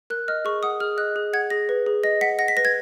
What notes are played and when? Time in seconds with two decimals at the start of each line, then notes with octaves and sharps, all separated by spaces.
0.10 A#4 F#6
0.28 D#5 F6
0.45 G#4 C#6
0.63 F#5 D#6
0.80 G#4 F6
0.98 D#5 F#6
1.16 G#4
1.33 F#5 G#6
1.50 G#4 A#6
1.69 B4
1.86 G#4
2.04 D#5 A#6
2.21 F#5 B6
2.39 F#5 A#6
2.48 B6
2.57 B4 A#6
2.65 G#6